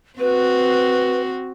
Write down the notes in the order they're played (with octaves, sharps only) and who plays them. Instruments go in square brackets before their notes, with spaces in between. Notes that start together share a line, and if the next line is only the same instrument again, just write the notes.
[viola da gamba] C4 F#4 [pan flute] B4